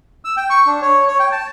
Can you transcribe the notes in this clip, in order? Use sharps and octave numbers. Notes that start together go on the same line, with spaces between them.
E6
G5
C#6
D4
C#5
C#5
G5
A5